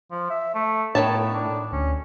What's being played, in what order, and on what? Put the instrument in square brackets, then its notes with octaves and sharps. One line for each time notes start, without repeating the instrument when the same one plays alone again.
[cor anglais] F3
E5
A3
[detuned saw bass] A2 [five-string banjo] D#3 C#5 A5 [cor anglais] B3
[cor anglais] D4
[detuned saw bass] D2 [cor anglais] C#4